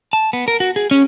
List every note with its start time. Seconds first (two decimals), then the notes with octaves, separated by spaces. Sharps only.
0.13 A5
0.33 B3
0.48 A#4
0.60 F#4
0.76 G#4
0.91 C#4